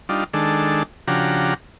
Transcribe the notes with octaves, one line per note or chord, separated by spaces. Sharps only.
G3 D4 D#4 F4
D#3 G#3 D4 A4
C#3 F3 D4 F#4 G4 A#5